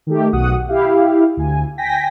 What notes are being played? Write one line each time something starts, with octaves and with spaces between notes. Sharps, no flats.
D#3 A3 G4
B1 F#4 F#5 D#6
E4 G4 F5
D2 G#5
G5 G#5 A#6 B6